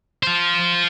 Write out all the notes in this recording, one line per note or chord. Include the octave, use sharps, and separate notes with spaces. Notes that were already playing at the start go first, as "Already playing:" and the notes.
F4 C5